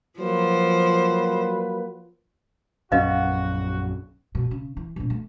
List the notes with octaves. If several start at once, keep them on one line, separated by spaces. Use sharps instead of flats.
F3 F#3 A#3 B4 C5
A#1 F#2 C#4 F#4 B4 D#5 F5
B2
C#3
E3
A#1 B2
A3